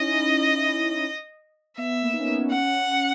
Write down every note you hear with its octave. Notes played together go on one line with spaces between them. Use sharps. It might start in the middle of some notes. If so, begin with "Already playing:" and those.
Already playing: C#4 D#4 E4 D#5
B3 E5
A#3
D#4
C#4
B3
C#4 F#5